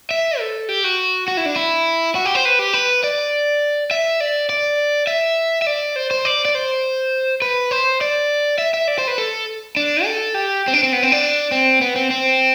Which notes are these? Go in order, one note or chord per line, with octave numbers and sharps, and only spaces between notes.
E5
A4
G4
F#4
F#4
E4
D4
E4
F#4
G4
C5
B4
G4
B4
D5
E5
D5
D5
E5
E5
D5
C5
C5
D5
D5
C5
B4
C5
D5
E5
E5
D5
C5
B4
A4
D4
A4
G4
C4
D4
C4
B3
C4
D4
C4
B3
C4
C4